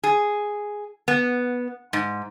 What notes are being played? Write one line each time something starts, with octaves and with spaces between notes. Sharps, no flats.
G#4
B3
G#2